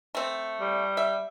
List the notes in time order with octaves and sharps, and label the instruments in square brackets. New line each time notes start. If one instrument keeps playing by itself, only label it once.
[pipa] A3 C4
[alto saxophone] G3
[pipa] E5